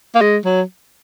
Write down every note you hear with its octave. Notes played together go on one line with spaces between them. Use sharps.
A#3
G#3
F#3